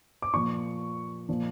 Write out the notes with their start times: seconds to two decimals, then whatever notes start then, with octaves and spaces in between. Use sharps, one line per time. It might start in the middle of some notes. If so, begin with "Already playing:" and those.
0.22 D6
0.33 A#2 F3 C#6
1.29 A#2 F3